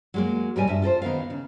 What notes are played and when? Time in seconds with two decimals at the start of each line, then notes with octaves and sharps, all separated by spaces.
0.14 F#3 G#3 A#3
0.56 G#2 B2 G3 A#4 C#5 G#5
0.67 G2 E5
0.82 F4 A4 A#4 C5
1.02 D#3 B3 A#4 F5
1.30 C#3